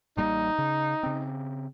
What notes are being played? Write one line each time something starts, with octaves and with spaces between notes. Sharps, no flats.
A1 G3 A#3 D#4
C#3
C#3 C4